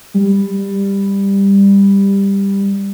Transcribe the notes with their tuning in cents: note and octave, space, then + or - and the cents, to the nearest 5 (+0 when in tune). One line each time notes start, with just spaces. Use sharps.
G3 +15